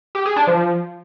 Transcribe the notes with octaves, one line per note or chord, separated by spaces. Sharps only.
G4
G#4
D4
F3